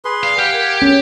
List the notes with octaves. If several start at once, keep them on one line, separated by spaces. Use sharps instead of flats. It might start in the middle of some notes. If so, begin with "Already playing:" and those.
G#4 B4 C6
D5 F5
G4 F5 F#5
A#4 G#6
C#4